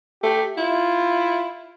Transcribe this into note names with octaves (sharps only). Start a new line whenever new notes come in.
A3 G4
E4 F4